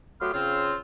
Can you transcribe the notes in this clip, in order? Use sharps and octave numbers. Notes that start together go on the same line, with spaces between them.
F#3 A3 B3 G4 C6 F6
C#3 C4 F4